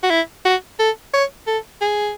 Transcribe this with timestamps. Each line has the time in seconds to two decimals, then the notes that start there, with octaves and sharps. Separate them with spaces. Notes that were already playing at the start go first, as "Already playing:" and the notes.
0.03 F#4
0.10 E4
0.45 F#4
0.79 A4
1.14 C#5
1.47 A4
1.81 G#4